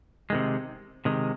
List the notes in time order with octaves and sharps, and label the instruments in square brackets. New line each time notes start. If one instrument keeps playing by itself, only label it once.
[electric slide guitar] C3 D#3 G#3
C3 D#3 G#3